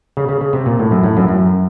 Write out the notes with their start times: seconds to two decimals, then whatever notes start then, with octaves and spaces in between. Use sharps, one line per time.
0.17 C#3
0.29 C#3
0.41 C#3
0.53 C3
0.66 A#2
0.79 A2
0.91 F#2
1.03 A2
1.17 F#2
1.28 F#2